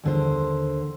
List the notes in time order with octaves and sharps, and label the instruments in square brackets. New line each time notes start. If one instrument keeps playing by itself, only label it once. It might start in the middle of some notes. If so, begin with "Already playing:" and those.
[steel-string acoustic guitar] D#2 D3 C5